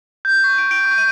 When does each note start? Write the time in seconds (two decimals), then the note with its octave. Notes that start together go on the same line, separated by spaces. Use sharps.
0.25 G6
0.44 C#6
0.58 D7
0.71 D7
0.86 C#6
0.98 D#7